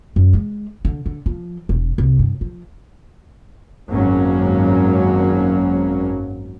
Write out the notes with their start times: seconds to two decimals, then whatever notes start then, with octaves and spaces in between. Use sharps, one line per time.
0.16 F#2
0.33 G#3
0.85 D3
1.06 D3
1.26 F3
1.69 E1
1.98 C2
2.19 G2
2.41 F3
3.89 G#1 F#2 F#3 A#3 C#4